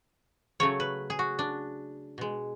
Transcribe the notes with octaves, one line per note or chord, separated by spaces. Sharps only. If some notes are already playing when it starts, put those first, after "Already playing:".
C#3 F#3 A3 C#5
B4
G#4
F#4
D4
B2 G#3